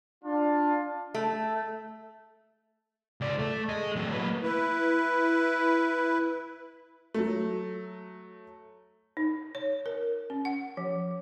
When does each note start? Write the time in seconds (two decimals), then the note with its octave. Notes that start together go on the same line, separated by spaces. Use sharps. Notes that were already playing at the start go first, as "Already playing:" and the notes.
0.24 D4 F4
1.15 A3
3.21 C#2 D5
3.39 A3 A4
3.69 G#4 D#5
3.96 F#3 A3
4.13 A#3 B4
4.43 E4 B4
7.14 F#3 A3
9.17 D#4
9.55 C#5
9.86 A#4
10.30 C#4
10.45 F#5
10.77 F3